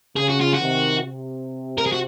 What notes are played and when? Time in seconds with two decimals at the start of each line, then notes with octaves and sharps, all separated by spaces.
0.16 C#3 G#4
0.29 F#4
0.40 F4
0.53 F#4
0.60 C3 D#3
1.04 C3
1.78 A#4
1.86 G#4
1.92 F#4